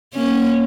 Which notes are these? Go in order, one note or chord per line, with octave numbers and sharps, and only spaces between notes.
A#3 C#4